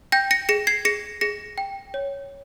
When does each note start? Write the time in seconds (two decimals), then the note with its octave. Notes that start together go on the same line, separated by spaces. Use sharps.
0.12 G5 G6 A#6
0.31 A#6 C#7
0.49 G#4 A#6 C#7
0.67 G#6 C7
0.85 G#4 A#6 C#7
1.21 G#4 A#6 C#7
1.58 G5
1.94 C#5